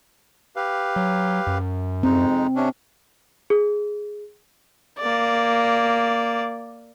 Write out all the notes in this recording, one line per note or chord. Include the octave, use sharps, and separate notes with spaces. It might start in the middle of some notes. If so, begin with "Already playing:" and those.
G4 B4 F5
F#3
F#2
F2 G#3 C4 D#4
C3 C#4 D4
G#4
A#3 D5